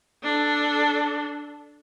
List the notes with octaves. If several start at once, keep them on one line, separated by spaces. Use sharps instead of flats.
D4 A4